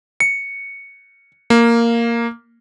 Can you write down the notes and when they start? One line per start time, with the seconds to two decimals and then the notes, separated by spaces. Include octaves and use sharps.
0.20 C#7
1.50 A#3